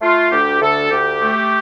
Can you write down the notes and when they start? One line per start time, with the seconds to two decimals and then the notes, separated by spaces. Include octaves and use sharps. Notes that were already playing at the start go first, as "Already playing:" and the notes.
0.02 A3 F4
0.32 D2 G4
0.61 D2 A4
0.91 D2 G4
1.21 A3